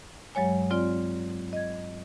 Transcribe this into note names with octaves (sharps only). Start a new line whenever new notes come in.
G2 F#3 G#3 C#5 G#5
C4 F4 D5
D#5 G#6